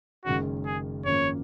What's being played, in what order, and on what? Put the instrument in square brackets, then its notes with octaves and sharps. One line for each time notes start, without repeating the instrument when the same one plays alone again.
[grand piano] F#1 F#2 D#3 G#3 C#4 [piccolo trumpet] F#4
[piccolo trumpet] G#4
[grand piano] G#1 F#2 C#3 F3 A#3 [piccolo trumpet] C#5